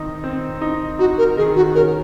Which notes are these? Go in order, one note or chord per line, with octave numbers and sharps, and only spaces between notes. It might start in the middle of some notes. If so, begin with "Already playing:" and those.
Already playing: D#3 C4 D#4
C4
D#4
D#4 F#4
A#4
D#3 G#4
F#4
C#4 A#4